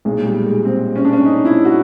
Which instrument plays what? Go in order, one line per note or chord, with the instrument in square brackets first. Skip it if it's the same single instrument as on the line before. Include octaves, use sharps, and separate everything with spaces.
[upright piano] B1 A#2 G#3
G3
G#3
C4
C#4
D4
C#4
D#4
E4
F#4